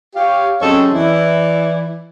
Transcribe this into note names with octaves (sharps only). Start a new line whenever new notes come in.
G4 C#5 F5
F#2 C#3 C4 A4 C#5 D#5
E3 E4 D5